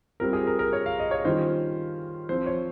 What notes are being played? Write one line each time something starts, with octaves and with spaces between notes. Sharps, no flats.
G3 C4 F4 A#4
G#4
A#4
A#4
C#5
F5
D#5
C#5
D#3 G3 C#4 F4 C5
F3 C4 F4 C5
C#5